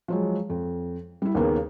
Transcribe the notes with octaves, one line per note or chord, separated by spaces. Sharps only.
F3 F#3 G#3
F2
G3 E4
D#2 C#3 A#3 B3